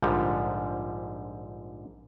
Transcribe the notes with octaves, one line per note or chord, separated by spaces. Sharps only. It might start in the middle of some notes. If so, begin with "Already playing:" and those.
A#1 G#2 D3 F3 G3